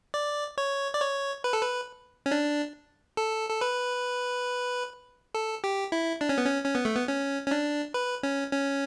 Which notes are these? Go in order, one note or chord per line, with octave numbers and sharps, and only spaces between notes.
D5
C#5
D5
C#5
B4
A4
B4
C#4
D4
A4
A4
B4
A4
G4
E4
D4
C#4
B3
C#4
C#4
B3
A3
B3
C#4
C#4
D4
B4
C#4
C#4